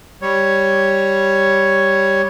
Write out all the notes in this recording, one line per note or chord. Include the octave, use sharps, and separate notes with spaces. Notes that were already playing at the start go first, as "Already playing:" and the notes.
G3 C#5